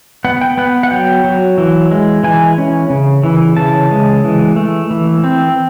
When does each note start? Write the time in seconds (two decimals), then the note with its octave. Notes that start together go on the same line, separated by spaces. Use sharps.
0.25 B3 F#5
0.41 G5
0.58 B3 F#5
0.83 F#5
0.91 F#3 G5
1.24 F#3
1.58 E3
1.91 G#3
2.24 E3 G#5
2.58 C#4
2.90 C#3
3.24 E3
3.57 C#3 A5
3.91 G#3
4.24 E3
4.56 A3
4.91 E3
5.24 C4